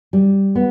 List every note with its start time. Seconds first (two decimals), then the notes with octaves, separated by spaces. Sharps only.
0.13 G3
0.55 B3